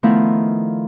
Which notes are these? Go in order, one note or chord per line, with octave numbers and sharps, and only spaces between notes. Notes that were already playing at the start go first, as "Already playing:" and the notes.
D#3 F3 A3 B3 D#4 E4